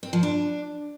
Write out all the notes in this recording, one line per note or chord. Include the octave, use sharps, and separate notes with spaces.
C4
F3
D4